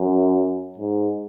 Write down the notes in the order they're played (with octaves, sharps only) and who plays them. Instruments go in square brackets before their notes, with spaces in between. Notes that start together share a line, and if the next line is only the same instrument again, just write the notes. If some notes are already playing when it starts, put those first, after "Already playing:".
Already playing: [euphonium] F#2
G#2